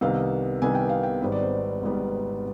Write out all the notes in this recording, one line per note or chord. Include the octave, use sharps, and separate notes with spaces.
C2 C3 D#3 B3 F5
C2 C3 D#3 B3 G#5
G5
F5
G5
G#1 G#2 G3 B3 C5
D5
C5
G#1 G#2 G3 B3